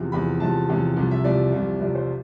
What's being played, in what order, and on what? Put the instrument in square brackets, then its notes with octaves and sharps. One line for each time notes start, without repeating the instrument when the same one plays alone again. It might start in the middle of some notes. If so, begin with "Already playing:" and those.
Already playing: [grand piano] E2 C3 F3
E2 C3 F3 B5
E2 C3 F3 A5
E2 C3 F3
C2 C3 F3
E5
C2 C3 F3 D5
C2 C3 F3
C2 C3 F3 D5
C5